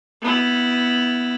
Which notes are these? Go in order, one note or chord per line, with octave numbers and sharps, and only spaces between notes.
B3 E4